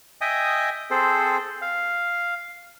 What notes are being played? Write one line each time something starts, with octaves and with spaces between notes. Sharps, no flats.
D#5 E5 G5 G#5 D#6
C4 G#4 A4 C5
F5